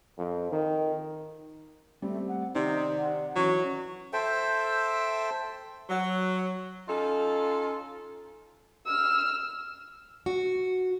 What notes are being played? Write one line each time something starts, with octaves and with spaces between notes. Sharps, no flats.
F2
D#3
G3 A3 C4
F#5
C3 D#3 D#4 D5
F#5
E3 F#3 C#4 C#6
A4 C5 E5 G5
F#3
C#4 D#4 F4 A4
E6 F6
F#4